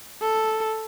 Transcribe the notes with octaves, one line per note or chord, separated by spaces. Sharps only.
A4